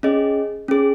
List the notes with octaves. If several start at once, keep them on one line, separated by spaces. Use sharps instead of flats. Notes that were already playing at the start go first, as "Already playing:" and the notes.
C#4 G#4 D#5
C#4 G#4